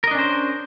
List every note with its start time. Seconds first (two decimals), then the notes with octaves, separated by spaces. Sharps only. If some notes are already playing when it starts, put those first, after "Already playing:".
0.04 A#4
0.07 D#5
0.11 D4
0.15 C#4
0.19 C5